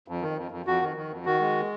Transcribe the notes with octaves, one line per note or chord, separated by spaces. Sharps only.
F2
D#3
F2
F2
F2 F#4
D#3
D#3
F2
D#3 F#4
G#3